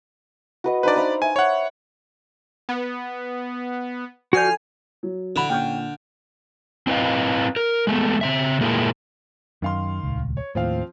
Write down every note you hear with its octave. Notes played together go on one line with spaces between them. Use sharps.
F#4 B4 D#5
D4 D#4 B4 C5 D5
F5 B5 D#6
E5 G#5
C#5 F#5
B3
D3 F3 F#4 G#5 F6 G6 C7
F#3
D3 E4 B5
A#2 C#4 G#4 G5 F6 G6
C4 E4 B4 D#5 F5
A#4
G#3 A3 B3
C#3 C4 E5
A#2 G#3 A#3 E4
F#2 D#3 F5 C6
D#1 G#1 C#2
C#5
D#2 A2 F3 C4 F5